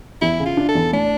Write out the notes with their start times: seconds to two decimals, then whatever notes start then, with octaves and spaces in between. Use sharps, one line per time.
0.22 E2 E4
0.39 C#3
0.46 F4
0.57 D4
0.69 A4
0.75 E2
0.93 A2 D4